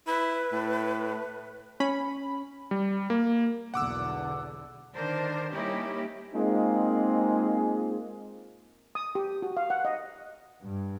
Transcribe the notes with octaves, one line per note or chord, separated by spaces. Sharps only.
E4 B4
A2
C#4 B5
G3
A#3
B1 E2 D3 F#5 D6 E6
D3 D#3 D4 A#4 C5
G3 A#3 C#4 D#4 E4 G4
G#3 A#3 C4 D#4 F4 G#4
D#6
G4
F#4
F5
F#5
D#5
G2